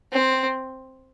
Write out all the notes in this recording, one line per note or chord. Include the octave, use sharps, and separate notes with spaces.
C4